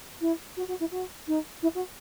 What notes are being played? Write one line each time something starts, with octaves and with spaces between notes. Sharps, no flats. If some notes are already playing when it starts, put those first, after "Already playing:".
E4
F#4
F#4
E4
F#4
D#4
E4
F#4